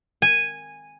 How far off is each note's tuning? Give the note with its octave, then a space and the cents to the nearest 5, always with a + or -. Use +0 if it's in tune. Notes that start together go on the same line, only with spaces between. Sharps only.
G#5 -10